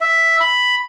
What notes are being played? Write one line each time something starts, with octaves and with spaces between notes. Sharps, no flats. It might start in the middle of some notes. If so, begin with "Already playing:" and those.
E5
B5